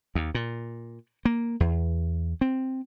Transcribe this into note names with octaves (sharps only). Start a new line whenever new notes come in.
D#2
A#2
A#3
E2
C4